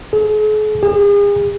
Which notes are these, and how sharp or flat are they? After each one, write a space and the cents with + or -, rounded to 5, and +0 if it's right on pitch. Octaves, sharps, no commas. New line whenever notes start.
G#4 +45
G#4 -40